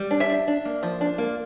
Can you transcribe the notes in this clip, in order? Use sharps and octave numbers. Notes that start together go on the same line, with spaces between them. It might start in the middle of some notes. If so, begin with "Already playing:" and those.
Already playing: G3
D4
E5
D4
D4
A#3
F3
D4
A#3